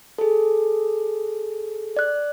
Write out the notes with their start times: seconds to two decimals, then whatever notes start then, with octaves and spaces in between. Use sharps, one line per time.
0.18 G#4 A4
1.97 D5 F#6